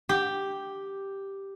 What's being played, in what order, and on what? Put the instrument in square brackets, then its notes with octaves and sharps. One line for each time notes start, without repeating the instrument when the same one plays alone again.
[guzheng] G4